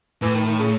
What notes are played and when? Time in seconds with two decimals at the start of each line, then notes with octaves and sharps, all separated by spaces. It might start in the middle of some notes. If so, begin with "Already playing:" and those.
0.22 A2 E3
0.34 D#3
0.46 D#3
0.59 C#3